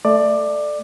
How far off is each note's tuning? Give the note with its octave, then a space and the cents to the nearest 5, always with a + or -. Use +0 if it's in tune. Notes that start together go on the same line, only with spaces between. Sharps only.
A3 +0 D5 +20